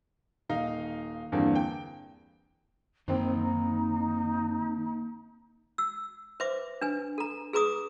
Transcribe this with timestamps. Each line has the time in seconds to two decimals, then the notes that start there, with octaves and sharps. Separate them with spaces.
0.49 D#1 D#4 F5
1.32 E2 G2 D3 A#3 C4
1.55 G5
3.08 F#2 D#3 A#3 C4 D#4 C5
5.78 E6
6.40 B4 C5 E5 D6
6.81 D4 B4 G#5
7.18 A4 A#5
7.53 G#4 B4 A#5 D6 D#6